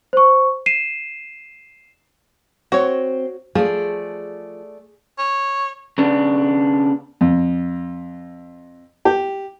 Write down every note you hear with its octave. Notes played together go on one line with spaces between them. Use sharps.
C5 C#6
C7 D#7 E7
C4 F#4 C#5
F3 A3 G#4 D5
C#5
C#3 B3 D4
F2
G4